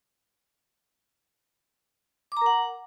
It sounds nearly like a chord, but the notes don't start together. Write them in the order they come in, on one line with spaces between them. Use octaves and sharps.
D6 A#5 A#4 F#5